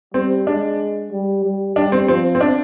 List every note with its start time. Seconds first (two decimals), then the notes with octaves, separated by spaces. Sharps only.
0.14 G3 C4
0.47 G#3 D4
1.12 G3
1.44 G3
1.76 G3 D4
1.92 C4
2.08 F3 C4
2.35 C4
2.41 D4